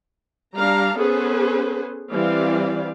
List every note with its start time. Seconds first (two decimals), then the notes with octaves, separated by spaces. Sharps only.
0.57 G3 D4 F5 A#5
0.98 B3 C#4 G#4 A4 B4 C5
2.11 E3 G3 C4 D5 F5